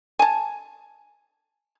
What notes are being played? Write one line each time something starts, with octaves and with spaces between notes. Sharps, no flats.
G#5 A5